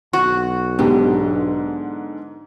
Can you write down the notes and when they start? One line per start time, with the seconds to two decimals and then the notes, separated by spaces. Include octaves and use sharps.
0.13 B1 F#4
0.79 G#2 D3 B3 D4 G4